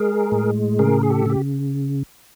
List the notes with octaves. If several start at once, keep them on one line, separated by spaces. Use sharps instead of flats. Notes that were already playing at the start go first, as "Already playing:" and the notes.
Already playing: G#3 G#4 A#4
A2
C#3 G#4 A#4
G#4
G4 A4
C#3 G4